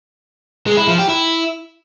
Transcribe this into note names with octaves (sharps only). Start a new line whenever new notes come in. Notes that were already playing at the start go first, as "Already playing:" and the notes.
G#3
E4
F3
G4
E4